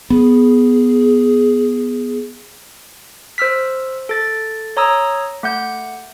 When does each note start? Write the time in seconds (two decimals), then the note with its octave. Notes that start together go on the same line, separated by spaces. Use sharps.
0.10 B3 G#4
3.38 C5 E6 F6 B6
4.09 A4 A6
4.77 C#5 A#5 D#6 E6
5.43 A3 F#5 G6